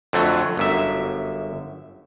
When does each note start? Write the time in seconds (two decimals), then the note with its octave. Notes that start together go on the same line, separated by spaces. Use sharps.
0.13 F2 D3 F#3 A3
0.57 G1 F#2 E5